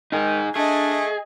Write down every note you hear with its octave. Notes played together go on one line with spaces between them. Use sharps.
D#3 D#4 G#4
A3 D4 G#4 D#5